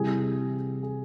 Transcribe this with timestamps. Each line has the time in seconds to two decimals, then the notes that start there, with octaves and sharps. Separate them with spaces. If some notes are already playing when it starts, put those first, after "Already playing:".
Already playing: C3 E3 G3 G#4
0.83 G#4